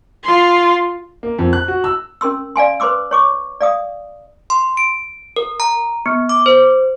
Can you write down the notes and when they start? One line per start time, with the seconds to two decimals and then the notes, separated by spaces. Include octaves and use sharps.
0.23 F4 C6
1.23 A#3
1.39 F2
1.53 F#6
1.68 F#4
1.84 E6
2.21 C#4 A#4 C6 E6
2.56 D5 F5 G#5 C6
2.80 B4 C5 C6 D6 E6
3.11 C#5 C#6 D6
3.61 D5 F5 D#6
4.50 C6
4.77 D7
5.36 A#4
5.60 A#5
6.06 B3
6.29 D6
6.46 C5